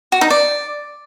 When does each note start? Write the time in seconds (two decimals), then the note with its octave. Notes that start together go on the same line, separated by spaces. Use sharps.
0.12 F#4
0.21 D#4
0.30 D5